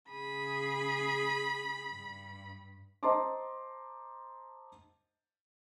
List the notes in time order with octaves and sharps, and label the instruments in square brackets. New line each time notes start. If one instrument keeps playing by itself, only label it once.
[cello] C#3 G#4 [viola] B5
[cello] G2
[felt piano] C5 D#5 A5 A#5 C6 D6